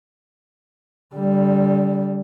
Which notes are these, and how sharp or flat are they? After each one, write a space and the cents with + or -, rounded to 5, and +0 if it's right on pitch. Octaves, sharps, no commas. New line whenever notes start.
D3 -25 G3 +0